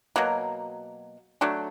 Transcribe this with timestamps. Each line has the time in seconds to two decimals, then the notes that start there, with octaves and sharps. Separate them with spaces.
0.16 B2 F#3 A#3
1.41 F#3 A3 D4